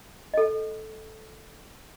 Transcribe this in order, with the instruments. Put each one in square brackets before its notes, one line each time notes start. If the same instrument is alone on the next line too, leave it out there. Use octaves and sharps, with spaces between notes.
[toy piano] A4 D#5